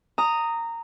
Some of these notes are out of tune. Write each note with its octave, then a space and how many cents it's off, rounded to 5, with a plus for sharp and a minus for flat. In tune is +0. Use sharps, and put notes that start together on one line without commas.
A#5 -15 D#6 +0